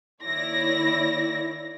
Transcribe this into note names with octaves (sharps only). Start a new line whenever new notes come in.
D#3 A#3 E4 C#5 D5 A#6